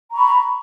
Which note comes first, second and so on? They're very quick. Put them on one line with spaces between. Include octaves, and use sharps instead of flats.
A#5 C#6 B5